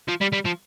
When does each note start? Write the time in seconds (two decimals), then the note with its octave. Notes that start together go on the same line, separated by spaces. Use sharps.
0.08 F3
0.21 G3
0.32 G3
0.45 F3